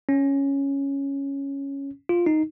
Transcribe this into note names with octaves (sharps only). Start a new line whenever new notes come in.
C#4
F4
D#4